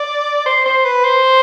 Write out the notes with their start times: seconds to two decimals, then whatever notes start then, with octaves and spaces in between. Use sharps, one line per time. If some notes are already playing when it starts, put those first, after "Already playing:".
Already playing: D5
0.46 C5
0.66 C5
0.85 B4
1.05 C5